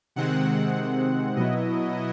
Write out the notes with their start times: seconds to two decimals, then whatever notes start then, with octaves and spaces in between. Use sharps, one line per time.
0.16 C3 D#3 G#3 C4 F#5
1.36 B2 F#3 B3 E4 D#5